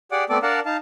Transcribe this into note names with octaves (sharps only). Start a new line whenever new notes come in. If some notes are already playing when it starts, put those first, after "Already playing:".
G4 G#4 D5 F#5 D6
A3 B3 C4 A4 D5 D6
D4 A#4 D5 F5 F#5 A5
D#4 F5 A5